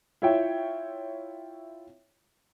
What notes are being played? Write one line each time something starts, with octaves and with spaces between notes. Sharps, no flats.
E4 F4 C#5 E5 G5